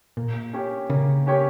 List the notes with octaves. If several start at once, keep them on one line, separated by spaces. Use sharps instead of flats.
A#2 A#3
C#4 G4 C#5
C#3 A#3
C#4 G4 C#5